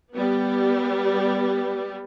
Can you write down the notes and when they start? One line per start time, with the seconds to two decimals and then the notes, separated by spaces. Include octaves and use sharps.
0.15 G3 B3